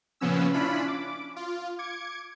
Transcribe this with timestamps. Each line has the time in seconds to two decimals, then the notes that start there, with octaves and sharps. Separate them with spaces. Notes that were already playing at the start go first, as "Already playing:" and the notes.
0.21 A#2 C#3 F3 B3 C#4 E6
0.53 C#4 D4 E4 F4 B5
0.88 D6
1.36 F4
1.78 D6 G#6 C#7